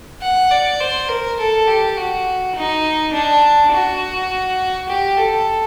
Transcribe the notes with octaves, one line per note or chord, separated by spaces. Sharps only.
F#5
D5
C5
A#4
A4
G4
F#4
D#4
D4
F#4
G4
A4